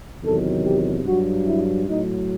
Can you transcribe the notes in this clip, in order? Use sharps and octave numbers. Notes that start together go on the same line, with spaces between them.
E2 C3 D#3 F#3 A4
G4
G2 F#3 F#4
E4
A2 F#3 D#4